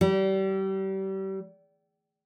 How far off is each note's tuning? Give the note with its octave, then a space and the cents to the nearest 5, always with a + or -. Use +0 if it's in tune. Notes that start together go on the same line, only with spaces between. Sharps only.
G3 -30